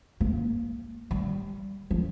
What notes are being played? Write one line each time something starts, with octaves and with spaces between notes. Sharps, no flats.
A#3
G3
F3